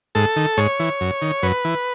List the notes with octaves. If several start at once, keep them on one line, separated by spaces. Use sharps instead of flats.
G#2 A4
D#3
G#2 C#5
E3
F#2
D#3
F#2 B4
E3